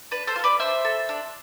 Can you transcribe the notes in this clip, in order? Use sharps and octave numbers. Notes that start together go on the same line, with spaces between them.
D4 B4
A4 C5
F4
A4
B4 D5
D4 C5 E5
A4
D4